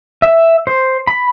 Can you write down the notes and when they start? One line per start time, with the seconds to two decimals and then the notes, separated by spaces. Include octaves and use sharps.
0.22 E5
0.67 C5
1.07 B5